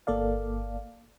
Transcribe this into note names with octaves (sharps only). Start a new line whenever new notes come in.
G1 A#3 A4 D5 F5